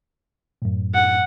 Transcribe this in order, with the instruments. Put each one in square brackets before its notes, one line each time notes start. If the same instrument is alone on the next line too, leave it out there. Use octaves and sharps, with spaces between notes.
[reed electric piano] F#2 A2
[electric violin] F#5